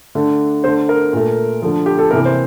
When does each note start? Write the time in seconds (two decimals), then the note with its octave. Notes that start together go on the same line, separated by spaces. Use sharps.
0.15 D3 A3
0.64 D3 A3 C5
0.89 A#4
1.13 A#2 A3
1.62 D3 F3 A3
1.86 G4
1.98 A4
2.11 C3 E3 A#3 A#4
2.25 C5